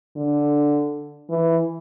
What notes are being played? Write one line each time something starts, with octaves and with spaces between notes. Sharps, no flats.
D3
E3